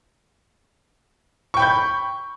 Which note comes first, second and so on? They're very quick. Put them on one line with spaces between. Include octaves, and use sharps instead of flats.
C#6 G5 B5 G6